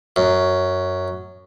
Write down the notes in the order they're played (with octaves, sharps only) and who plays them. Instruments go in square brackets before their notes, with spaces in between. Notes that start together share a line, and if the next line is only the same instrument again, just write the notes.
[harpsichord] F#2